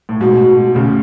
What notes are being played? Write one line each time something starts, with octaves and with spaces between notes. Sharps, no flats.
A2
G#2 B2 F#4
A2 C#3